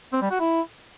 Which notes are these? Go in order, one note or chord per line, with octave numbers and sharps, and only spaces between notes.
C4
G3
F#4
E4